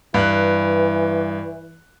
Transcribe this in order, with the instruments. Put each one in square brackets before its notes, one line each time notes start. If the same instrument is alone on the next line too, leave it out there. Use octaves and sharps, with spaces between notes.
[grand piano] G2 F#6 [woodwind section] E3